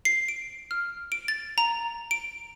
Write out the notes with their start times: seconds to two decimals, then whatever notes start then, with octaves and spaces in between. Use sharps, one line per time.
0.05 C7
0.28 D7
0.71 F6
1.12 D7
1.28 A6
1.58 A#5
2.11 D7